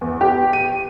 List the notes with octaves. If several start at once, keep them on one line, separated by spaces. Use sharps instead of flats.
E2
G4
D#7